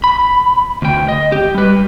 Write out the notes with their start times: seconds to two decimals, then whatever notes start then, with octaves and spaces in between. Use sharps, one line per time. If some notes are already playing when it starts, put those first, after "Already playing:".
0.04 B5
0.82 D2 G5
1.08 D#5
1.32 G4
1.54 G3 B4